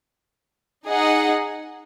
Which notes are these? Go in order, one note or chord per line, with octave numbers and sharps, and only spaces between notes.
D#4 G#4 D#5 F#5